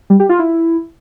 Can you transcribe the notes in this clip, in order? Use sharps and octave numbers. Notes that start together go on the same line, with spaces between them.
G3
G4
F4
E4